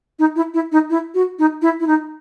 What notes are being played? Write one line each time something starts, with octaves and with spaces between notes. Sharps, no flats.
D#4
E4
E4
D#4
E4
F#4
D#4
E4
E4
D#4